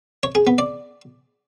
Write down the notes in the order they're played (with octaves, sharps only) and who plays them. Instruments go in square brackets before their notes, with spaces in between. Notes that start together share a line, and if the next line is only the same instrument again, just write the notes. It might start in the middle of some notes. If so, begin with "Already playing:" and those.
[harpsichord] C#5
G#4
B3
D5